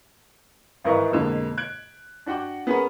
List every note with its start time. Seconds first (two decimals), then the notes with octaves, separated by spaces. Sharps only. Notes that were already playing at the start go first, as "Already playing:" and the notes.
0.84 G#1 E3 A#4 B4 D#5 C#6
1.12 F2 B2 D3 G#3 A#3
1.57 F#6 G#6 D7
2.26 D4 F#4 F#5 G5 D6
2.67 B3 C#4 G#4 A#4 F#5 B5